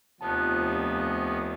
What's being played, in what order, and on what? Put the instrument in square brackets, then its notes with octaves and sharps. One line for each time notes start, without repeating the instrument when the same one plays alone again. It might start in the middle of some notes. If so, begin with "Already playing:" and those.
[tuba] F1 [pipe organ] D#2 B3 [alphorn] F3 [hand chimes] A5 F#6